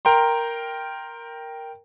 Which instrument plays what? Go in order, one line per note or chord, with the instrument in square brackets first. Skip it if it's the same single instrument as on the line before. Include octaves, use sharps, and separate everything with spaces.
[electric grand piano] A#4 G5 A#5 C6